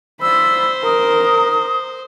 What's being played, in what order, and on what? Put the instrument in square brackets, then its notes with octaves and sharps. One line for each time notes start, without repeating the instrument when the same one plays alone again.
[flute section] F4 D5 E6 [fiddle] C5 [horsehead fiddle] B5
[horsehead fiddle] A#4 [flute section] D#6